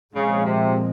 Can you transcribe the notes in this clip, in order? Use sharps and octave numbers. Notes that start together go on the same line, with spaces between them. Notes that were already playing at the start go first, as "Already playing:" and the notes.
A#2 C#3 F3 G#3 C4
C3